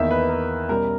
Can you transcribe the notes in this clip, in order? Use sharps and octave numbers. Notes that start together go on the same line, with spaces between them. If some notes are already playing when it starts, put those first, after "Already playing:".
Already playing: E2 D#3 A#3 D#4 E5
B4
A#4
B2 G3 C#4 A#4